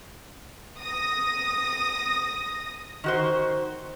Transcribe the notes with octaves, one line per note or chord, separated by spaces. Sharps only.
D#6 A#6
D#3 F#4 C5